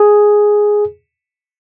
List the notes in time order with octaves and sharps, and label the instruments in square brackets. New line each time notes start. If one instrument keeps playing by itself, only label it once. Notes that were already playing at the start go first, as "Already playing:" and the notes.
Already playing: [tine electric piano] G#4